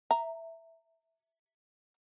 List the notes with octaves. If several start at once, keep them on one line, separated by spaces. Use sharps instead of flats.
E5 A#5